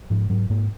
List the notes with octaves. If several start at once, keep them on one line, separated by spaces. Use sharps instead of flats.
G#2 F3
G#2 F#3
G#2 A#3